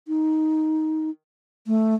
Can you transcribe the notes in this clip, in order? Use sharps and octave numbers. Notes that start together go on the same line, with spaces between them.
D#4
A3